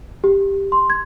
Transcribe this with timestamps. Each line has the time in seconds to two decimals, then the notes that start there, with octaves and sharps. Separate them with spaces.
0.24 G4
0.72 C6
0.90 G#6